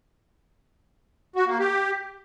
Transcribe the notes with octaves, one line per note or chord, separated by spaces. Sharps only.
F#4
A#3
G4